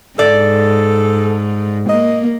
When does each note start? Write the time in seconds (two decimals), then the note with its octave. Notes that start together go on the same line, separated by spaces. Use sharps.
0.19 G#2 A4 D5
1.89 A#3 D#5